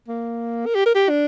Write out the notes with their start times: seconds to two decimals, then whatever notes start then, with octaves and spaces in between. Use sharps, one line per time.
0.08 A#3
0.66 A#4
0.75 G4
0.86 A#4
0.95 G4
1.09 D4